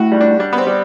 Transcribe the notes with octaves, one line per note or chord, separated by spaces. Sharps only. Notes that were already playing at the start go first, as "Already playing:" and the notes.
Already playing: A2 F#4
G3
D4
G3 D4
B3
C4
G3